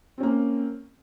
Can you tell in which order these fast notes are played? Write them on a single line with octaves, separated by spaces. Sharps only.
C4 C#4 A#3